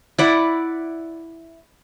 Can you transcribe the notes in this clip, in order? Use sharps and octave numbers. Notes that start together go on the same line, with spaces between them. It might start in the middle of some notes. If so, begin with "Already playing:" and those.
E4 D5 F#5